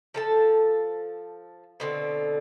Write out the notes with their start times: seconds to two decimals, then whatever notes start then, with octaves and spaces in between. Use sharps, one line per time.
0.14 F3 A4 A5
1.80 B2 D3 C4